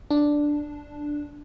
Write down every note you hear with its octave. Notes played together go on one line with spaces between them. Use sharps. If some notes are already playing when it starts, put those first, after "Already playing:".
D4